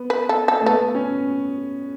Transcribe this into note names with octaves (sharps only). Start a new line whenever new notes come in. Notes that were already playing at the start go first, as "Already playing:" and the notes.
Already playing: B3
B4
A4
A4
A3
B3 A4
C#4